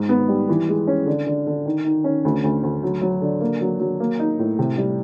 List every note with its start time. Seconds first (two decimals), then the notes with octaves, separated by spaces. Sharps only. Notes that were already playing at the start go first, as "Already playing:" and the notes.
Already playing: G#2
0.09 B3
0.29 G3
0.49 E3
0.69 G#3
0.87 C#4
1.06 D3
1.27 D3
1.47 D3
1.66 D#3
1.85 D#3
2.04 C#4
2.25 D2
2.44 D2
2.63 D2
2.83 F#3
3.02 F#3
3.22 D3
3.41 A#3
3.61 F#3
3.80 F#3
4.00 A#3
4.19 D#4
4.39 A2
4.59 C3
4.78 G3